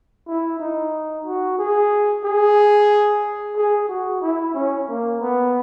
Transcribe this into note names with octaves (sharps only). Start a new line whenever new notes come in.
E4
D#4
F#4
G#4
G#4
G#4
F#4
E4
C#4
A#3
B3